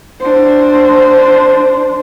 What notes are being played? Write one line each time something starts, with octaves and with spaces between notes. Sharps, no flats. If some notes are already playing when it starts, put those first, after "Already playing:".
D4 C5